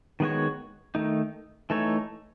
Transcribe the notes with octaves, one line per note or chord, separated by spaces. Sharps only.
D#3 G#3 B3 F#4 C#5
D#3 A3 D#4
E3 A3 D#4 A4 C#5